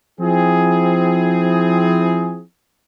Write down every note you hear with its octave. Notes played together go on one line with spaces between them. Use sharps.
F3 C4 E4 G#4